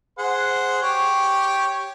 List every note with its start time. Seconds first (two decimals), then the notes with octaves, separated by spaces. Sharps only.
0.18 G#4 C5 F#5
0.83 G4 C#5